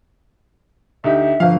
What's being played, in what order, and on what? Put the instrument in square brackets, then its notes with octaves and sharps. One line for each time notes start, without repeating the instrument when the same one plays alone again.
[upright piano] D2 D#4 G4 [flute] E5
[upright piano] G1 F5 [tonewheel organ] F3